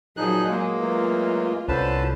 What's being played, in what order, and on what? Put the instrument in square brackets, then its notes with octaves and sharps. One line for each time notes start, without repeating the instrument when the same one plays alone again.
[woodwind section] A#2 [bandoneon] F3 D#4 F#6 [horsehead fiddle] F#3 G#4
[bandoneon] G#3 A#3
[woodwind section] E3 F#3 A3 [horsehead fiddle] F4
[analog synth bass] C2 [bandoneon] D3 B4 A5 [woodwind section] C#4 C5